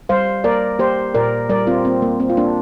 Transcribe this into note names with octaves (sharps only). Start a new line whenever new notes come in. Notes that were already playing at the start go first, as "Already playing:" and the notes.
G3 C5 F5
A#3 A#4 D5
A#3 G4 C5
A#2 A#4 D5
G3 A#4 D5
C4 F4
A#3 C4
A#3
A#3 C4
F4
A#3 D4